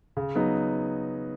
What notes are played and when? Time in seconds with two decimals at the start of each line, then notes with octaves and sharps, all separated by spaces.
0.17 C#3
0.36 F#3 B3 D#4